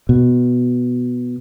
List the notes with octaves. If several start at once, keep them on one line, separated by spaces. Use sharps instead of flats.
B2